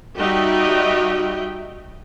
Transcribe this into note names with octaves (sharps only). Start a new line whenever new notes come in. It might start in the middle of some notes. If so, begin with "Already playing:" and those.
G3 D#4 F#4 D#5 E5 G5